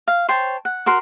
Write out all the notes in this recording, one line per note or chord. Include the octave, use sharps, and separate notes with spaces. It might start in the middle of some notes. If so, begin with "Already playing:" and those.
F5
C5 C#5 G5 A5
F#5
F#4 A#4 C6